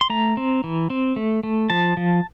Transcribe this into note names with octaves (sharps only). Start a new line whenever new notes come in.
C6
A3 A#5
C4
E3
C4
A3
A3
F3 A5
F3